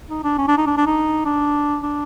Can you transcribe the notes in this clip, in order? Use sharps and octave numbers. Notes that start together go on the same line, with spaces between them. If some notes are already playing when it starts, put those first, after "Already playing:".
D#4
D4
C#4
D4
D#4
D4
D4
D#4
D4
D4